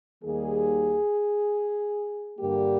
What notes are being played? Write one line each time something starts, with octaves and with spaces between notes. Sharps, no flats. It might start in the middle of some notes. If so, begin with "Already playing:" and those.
D#2 D#3 G3 A#3 G#4
G2 D3 G3 A#3 G4